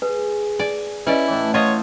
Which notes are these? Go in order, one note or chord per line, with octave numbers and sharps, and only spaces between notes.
G#4 B4
D5 G#5
C#4 E4 B4 D5 D#5
A2 E3
F4 C5 C#5 D#5 F#5